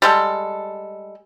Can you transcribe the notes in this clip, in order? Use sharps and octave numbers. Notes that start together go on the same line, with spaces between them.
G3 G#3 A4